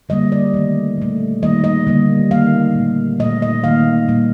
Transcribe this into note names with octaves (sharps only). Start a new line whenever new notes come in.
D3 G3 A#3 D#5
D5
D#3 A3
A#2 A3
D#3 G3 A#3 D#5
D#5
D3 G3 A#3
D#3 A#3 F5
A#2 A3
A#2 A3 D#5
D#5
D#3 A#3 F5
A#2 G3 A#3